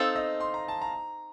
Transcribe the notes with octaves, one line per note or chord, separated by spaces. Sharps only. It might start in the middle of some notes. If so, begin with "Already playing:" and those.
Already playing: C4 D#4 A4 F5
D#5
C6
A#5
A5
A#5